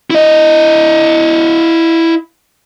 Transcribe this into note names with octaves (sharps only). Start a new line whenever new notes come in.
E4 D#5